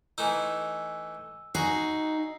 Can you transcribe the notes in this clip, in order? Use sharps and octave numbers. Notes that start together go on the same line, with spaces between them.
E3 A3 D#4 E6
D#4 F#4 G#4 C7